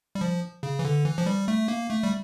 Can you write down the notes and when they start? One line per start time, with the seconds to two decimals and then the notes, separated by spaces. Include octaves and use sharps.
0.15 G3
0.21 F3
0.63 C#3
0.79 E3
0.85 D3
1.05 E3
1.18 F3
1.26 G3
1.48 A3
1.68 A#3
1.90 A3
2.03 G3